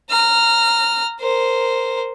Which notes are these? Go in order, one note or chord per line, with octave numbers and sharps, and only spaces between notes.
A#5 F6
A#4 C5